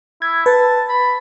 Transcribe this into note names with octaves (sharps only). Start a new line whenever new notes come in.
E4 G#6
B4 A5
B5